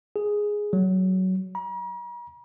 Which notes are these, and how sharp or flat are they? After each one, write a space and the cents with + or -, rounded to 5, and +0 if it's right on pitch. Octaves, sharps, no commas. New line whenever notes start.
G#4 +0
F#3 +15
A#5 +45